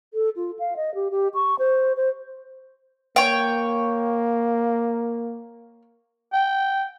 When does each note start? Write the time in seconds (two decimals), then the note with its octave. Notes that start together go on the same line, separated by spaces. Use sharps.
0.14 A4
0.36 F4
0.59 F5
0.76 D#5
0.95 G4
1.11 G4
1.34 C#6
1.59 C5
1.97 C5
3.16 A#3 C#5 G5
6.33 G5